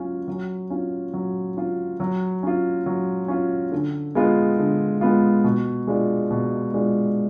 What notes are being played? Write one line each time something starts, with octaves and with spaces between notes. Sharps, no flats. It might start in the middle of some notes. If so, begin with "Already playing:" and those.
Already playing: F#3 C#4 F4
F#3
C#4 F4
F#3
C#4 F4
F#3
C#4 F4
F#3
C#4 F4
D3
G#3 B3 F4
D3
G#3 B3 F4
B2
G#3 D4 F4
B2
G#3 D4 F4